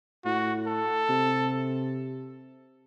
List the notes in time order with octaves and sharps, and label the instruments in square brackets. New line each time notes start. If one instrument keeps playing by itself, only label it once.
[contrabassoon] A2 [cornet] F#4
[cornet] A4
[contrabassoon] C3